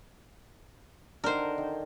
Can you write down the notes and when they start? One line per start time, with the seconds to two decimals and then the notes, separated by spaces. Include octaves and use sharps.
1.24 D3 D#3 A#4 C5
1.58 D#3